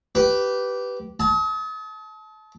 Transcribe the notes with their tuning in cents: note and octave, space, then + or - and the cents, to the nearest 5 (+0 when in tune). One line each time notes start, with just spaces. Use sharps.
G4 -15 B4 +0
A5 -25 D#6 +40